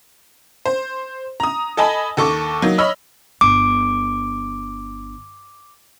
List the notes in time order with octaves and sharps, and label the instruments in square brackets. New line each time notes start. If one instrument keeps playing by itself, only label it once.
[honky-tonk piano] C5
A#5 D#6
A4 D#5 G#5 A5 B5
D#2 A4 C#6 D6
F#3 A#3 D#4
C#5 D#5 B5 E6 F6
[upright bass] G1 [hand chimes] D6